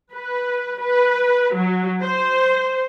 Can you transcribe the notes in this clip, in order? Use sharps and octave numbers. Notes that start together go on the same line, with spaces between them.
B4
B4
F#3
C5